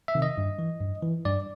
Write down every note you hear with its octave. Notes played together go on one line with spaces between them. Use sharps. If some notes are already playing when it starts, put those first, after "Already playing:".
E5
C3 D#3
D#5
G2
E3
G2
E3
G2 D5